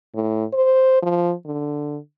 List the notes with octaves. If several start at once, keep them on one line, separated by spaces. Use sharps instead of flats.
A2
C5
F3
D3